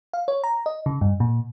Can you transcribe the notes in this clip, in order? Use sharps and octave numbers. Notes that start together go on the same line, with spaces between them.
F5
C#5
A#5
D#5
C#3
G2
A#2